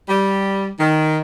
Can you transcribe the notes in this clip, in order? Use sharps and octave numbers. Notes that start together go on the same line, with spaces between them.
G3
D#3